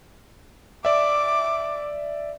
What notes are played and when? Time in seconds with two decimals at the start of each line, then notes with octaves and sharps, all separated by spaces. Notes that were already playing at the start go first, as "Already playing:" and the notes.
0.85 D5 E5 D6